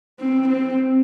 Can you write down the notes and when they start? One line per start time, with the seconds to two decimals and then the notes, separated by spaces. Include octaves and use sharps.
0.20 C4
0.48 C4